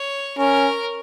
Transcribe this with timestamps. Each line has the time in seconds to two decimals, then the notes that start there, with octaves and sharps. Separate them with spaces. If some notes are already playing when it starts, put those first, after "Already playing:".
Already playing: C#5
0.38 C#4 A#4